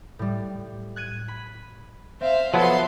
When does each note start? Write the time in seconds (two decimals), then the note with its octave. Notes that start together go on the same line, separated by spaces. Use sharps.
0.19 A2 G3
0.96 F#6 G#6 D#7
1.28 B5
2.21 C4 C5 E5 F5
2.54 F3 F#3 B3 A4 E5 C6